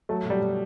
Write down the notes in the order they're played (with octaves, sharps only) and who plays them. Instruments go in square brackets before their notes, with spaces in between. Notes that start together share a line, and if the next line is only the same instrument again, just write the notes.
[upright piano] F#3 [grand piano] A3
[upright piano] B2
[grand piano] G3
[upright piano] B2